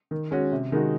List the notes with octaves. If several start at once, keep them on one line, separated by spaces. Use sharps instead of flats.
D#3
G#3 C#4 F#4
C3
D#3 G#3 D#4 F#4